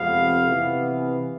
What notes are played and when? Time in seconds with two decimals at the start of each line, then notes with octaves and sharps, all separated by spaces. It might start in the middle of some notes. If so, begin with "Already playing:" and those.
Already playing: F2 C3 G#3 B3 F5
0.44 C3 E3 B3